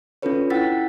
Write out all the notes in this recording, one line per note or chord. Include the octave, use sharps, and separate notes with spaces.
C#4 D4 F4 A4 B4 C#5
E4 F#5 G5 E6 A6 B6